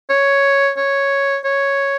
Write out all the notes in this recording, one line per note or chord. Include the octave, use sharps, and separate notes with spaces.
C#5
C#5
C#5